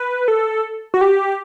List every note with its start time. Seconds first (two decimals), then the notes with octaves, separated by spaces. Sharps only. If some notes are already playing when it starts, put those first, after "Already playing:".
Already playing: B4
0.28 A4
0.94 F#4
1.01 G4